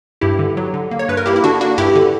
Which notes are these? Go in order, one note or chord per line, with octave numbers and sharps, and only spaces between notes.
G2 E4 G4
D3
F#3
D3
A#3
C#5
G2 B4
A#4
A#3 E4 G4
E4
D3 D4 F#4
A#3 D4 F#4
G2 E4 G4
D3